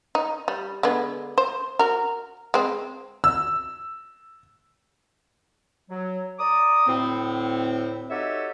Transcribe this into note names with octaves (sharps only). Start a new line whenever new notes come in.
D#4
G3
D3 G#3 B3
C5
F#4 A#4
G#3 C4
E6
F#3
D5 A#5 D6 D#6
D2 A2 C4
D#4 F#4 G4 A4 C#5 E5